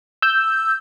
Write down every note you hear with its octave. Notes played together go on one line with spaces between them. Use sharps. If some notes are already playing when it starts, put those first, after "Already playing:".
E6 G6